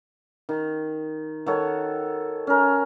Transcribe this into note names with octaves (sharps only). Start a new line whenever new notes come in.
D#3
D#3 F#4 A4 C#5
C#4 A#4